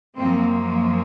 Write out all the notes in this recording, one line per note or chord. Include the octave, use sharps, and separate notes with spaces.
F#2 F3 A#3 C4